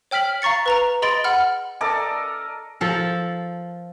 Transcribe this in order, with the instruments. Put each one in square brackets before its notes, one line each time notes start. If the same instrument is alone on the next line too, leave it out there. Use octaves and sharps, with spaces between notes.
[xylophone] C#5 G5 F6 B6 F#7
F5 A#5 C#6 A6 C#7
B4 A#5 F7
G#4 D#5 B5 C6 A6 D7
F#5 B5 F6
[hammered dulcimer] A4 A#4 D5 D#5
[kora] F3 A4 A#4